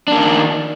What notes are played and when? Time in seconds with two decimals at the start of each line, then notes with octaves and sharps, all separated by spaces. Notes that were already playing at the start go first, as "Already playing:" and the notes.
0.08 D4
0.12 A#3
0.16 D#3